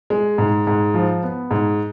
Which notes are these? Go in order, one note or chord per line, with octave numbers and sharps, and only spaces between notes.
G#3
G#2
G#2
F3
B3
G#2